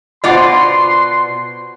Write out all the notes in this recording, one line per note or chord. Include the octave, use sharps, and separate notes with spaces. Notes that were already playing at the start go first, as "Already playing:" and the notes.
B2 F4 C5 D5 F#5 C6 D6